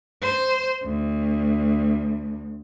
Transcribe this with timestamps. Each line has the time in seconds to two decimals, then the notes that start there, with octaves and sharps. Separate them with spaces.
0.22 C5
0.83 D2